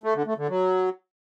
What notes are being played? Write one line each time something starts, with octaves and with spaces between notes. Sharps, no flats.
A3
D3
A3
D3
F#3